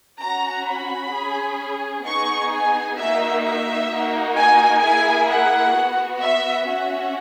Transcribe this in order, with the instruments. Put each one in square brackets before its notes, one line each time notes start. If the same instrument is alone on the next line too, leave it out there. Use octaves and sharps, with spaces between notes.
[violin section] C#4 F#4 A#5
B5
C#4 G#4
B3 D#4 G#4 C#6
G#5
A#3 D#4 F#4 E5
E5
A#3 D#4 F#4
G#5
A#3 E4 G#4 G#5
F#5
B3 F#4
E5
C#4 F#4 E5